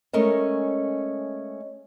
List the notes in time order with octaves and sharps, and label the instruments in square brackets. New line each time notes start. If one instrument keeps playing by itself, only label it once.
[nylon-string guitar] G#3 A3 C#4 A#4 D#5